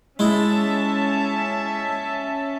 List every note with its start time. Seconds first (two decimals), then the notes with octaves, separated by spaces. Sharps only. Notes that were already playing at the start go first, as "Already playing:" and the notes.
0.19 G#3 C#4 E4 E5 A5